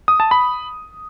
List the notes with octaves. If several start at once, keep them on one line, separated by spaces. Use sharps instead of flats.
D#6
A5
B5